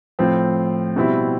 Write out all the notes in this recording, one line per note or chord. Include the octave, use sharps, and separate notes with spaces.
A2 F3 C4
B2 G3 C4 E4